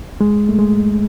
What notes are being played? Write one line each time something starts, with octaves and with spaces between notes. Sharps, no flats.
G#3
A3
G#3